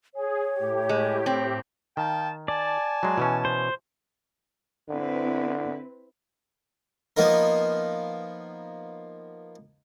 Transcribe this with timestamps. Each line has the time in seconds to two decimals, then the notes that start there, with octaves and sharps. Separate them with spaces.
0.15 G#4 C#5
0.55 A2 G4
0.89 G#3
1.26 C4
1.97 D#3 F5 G5 A5
2.48 D5 G#5 A5
3.03 F#3 G#3
3.18 B2 E3 C#4
3.45 C5
4.89 D3 C4 E4 B4
7.17 F3 A#3 B3 D#4 A#4